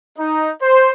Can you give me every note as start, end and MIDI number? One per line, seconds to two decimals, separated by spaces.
0.18 0.49 63
0.61 0.92 72